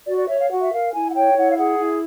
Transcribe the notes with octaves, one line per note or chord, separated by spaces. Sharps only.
F#4 D5
D5
C#5 E5
F5
F#4 F#5
E5
A#4 F5
E4 G#5
F#5
C#5 G5
F5
E4 F#5
F5
G#4 F#5
E4